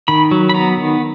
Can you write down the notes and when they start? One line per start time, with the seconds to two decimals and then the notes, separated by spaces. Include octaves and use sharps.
0.08 D#3 B5
0.31 F#3
0.49 B5
0.54 B3 A#5
0.77 D#3